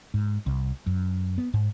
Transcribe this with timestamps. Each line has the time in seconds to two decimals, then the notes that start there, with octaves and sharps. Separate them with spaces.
0.14 G#2
0.46 C2
0.86 F#2
1.38 B3
1.54 G#2